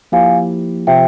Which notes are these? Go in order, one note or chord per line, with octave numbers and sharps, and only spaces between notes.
F3 A#3 E4 G4 F5 G#5
C3 F3 E5 G5